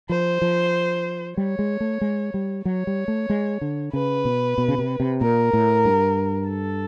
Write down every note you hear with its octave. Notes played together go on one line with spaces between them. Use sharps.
F3 C5
F3
G3 C#5
G#3
A3
G#3
G3
F#3 C#5
G3
A3
G#3
D3
C#3 B4
B2
B2
C#3
C3
C3
A#2 A#4
A2
G2
A4